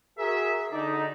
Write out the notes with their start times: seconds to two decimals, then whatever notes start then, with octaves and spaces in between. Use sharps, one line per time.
0.18 F#4 G#4 A#4 E5
0.72 D3 D#4 D5